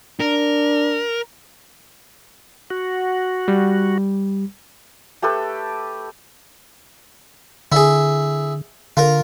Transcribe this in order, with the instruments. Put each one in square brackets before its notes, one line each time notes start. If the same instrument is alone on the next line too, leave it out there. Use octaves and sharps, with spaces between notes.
[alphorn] D4 [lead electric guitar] A#4
[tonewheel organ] F#4
[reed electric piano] G3
[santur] A3 G4 A4 B4
[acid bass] D3 [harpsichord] E4 G#4
[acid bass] D3 [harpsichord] F4 A#4